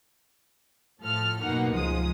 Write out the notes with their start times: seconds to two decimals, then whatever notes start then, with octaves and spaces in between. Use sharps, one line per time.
1.01 A2 F3 A4 F6
1.43 F#2 B2 A#3 D#4 F#5
1.72 C#2 F3 G#3 D#6